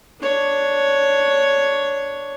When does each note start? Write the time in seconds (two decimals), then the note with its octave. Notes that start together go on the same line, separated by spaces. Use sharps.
0.21 D4 C#5